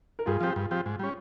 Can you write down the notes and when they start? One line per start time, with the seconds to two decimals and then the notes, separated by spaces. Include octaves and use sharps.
0.19 A#4
0.26 G2 F4 G#4
0.41 F3 C4 G4
0.56 G2
0.71 F3 C4 G4
0.86 G#2
0.99 G3 C#4